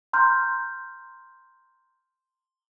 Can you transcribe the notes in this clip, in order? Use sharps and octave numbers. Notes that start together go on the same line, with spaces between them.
A#5 C6 F6 G6